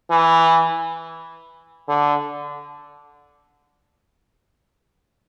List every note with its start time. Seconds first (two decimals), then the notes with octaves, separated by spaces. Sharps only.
0.10 E3
1.88 D3